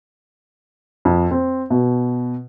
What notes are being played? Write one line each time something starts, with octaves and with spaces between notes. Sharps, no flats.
F2
C4
B2